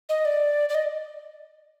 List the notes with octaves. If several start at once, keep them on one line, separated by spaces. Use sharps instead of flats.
D#5
D5
D5
D#5